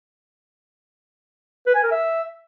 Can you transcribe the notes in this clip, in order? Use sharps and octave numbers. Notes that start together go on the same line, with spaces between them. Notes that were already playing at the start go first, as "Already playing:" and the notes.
B4
G#5
A#4
E5